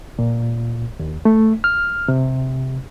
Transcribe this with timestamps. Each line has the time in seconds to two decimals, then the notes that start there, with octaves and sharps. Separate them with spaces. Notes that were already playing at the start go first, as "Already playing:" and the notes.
0.19 A#2
1.00 D#2
1.25 A3
1.64 F6
2.08 C3